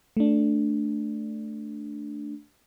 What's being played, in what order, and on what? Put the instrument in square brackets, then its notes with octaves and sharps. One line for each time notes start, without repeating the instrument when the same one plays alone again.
[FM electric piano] A3 D4